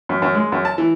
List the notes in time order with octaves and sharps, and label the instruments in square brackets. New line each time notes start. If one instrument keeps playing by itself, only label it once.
[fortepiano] F#2
F#2
G#3
F#2
A5
E3